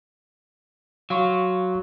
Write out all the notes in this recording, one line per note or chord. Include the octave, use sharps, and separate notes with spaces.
F#3 F5 C6 C#6